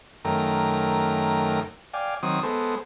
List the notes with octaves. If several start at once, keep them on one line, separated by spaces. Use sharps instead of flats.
F#2 D#3 A3 A#4 G5
D5 F5 G5 G#5
D#3 F#3 C4 D#6
G#3 B3 A4 C5